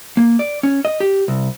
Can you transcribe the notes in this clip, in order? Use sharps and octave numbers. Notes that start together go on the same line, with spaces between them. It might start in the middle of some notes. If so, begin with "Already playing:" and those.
A#3
D5
C#4
D#5
G4
C2